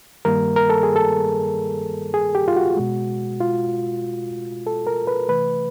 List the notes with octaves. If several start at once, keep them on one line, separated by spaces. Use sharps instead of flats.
G2 D#3 G3 A#3 A#4
A#4
A4
G#4
A4
G#4
G4
F4
F#4
B2 G#3
F4
A4
A#4
B4
C3 E3 A3 B4